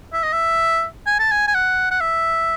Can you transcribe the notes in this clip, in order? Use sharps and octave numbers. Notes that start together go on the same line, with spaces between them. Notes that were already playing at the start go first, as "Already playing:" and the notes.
E5
D#5
E5
G#5
A5
G#5
G#5
F#5
F#5
E5